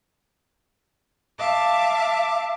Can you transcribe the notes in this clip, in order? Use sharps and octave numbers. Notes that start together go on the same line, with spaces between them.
E5 F5 A5 D6